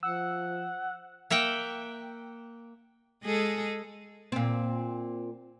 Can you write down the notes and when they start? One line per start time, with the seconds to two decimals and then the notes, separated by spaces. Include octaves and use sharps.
0.03 F3 F#5 E6
1.30 A#3 E5 F#5 G5
3.23 G#3 G#4 A4
4.32 A#2 C4